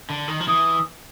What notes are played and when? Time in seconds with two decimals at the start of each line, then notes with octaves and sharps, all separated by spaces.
0.10 D3
0.28 D#3
0.40 F3
0.48 E3 D#6